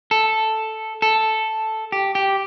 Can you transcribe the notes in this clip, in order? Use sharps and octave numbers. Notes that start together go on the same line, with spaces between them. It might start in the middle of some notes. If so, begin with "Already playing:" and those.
A4
A4
G4
G4